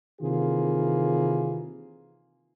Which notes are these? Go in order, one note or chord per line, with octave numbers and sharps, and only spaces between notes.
C3 D#3 E3 A#3 F4 G#4